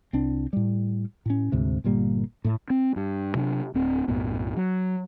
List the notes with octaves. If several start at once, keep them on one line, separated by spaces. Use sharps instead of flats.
C2 C4 D4
A2 G3
A2 C#4
D2 G#2 C3
G1 A#2 G3 A#3
A2 A3
C4
G2
C3 F#3 C#4 D4
D1 C4
B1 F#2 A2 B3
F#3